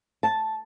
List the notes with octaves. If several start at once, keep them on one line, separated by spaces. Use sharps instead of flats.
A5